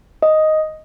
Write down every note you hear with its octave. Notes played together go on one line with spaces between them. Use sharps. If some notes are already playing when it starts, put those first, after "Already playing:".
D#5